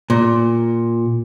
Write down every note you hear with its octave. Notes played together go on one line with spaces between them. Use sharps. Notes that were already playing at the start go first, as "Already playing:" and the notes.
A#2